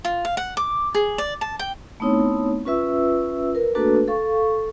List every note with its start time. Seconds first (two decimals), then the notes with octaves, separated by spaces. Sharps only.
0.05 F4
0.25 F5
0.37 F#5
0.57 D6
0.95 G#4
1.18 D5
1.41 A5
1.59 G5
2.00 A3 B3 C4 D#4 E4 C#5
2.65 C#4 F4 B4 E5 E6
3.55 A#4 B4
3.75 A3 A#3 D4 F#4 A4 B4
4.08 A4 F5 C#6